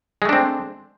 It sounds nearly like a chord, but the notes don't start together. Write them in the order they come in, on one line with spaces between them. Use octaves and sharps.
G#3 A3 D4 C4